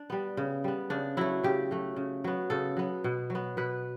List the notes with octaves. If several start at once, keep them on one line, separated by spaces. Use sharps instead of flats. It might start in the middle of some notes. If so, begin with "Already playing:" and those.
Already playing: D4
G3 B3
C#3
G3 B3
C#3 D4
F#3 A3 E4
C#3 G4
F#3 A3
C#3
F#3 B3
C#3 A4
F#3 B3
B2
F#3
B3
B2 B4